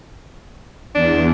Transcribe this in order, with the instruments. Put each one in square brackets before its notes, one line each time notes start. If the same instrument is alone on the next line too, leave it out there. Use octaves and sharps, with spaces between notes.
[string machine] E2 [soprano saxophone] D4